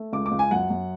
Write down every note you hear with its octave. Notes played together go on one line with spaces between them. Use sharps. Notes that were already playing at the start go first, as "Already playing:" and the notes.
Already playing: A3
C#2 D6
D6
C#2
G#5
F#2 F#5
F#2